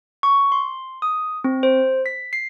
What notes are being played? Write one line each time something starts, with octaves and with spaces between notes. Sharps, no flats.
C#6
C6
D#6
C4
C5
B6
C7